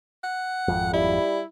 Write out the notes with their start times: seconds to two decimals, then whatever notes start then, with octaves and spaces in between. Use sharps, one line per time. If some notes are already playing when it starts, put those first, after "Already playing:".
0.24 F#5
0.68 G#1 F2
0.93 G3 E4